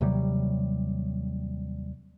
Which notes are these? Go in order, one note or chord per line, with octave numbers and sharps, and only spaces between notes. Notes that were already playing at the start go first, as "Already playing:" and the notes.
D#2 C3 F#3 G3